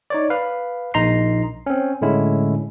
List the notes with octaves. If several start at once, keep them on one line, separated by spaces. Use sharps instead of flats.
D#4 C#5 D5
B4 F5
A#1 D#4 A#5 C6 C7
C4 C#4
A2 D3 G#3 C#4 E4